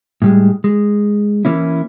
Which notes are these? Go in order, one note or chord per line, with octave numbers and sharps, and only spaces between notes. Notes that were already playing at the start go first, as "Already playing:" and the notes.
A2 G3 G#3
G#3
E3 A#3 C#4 E4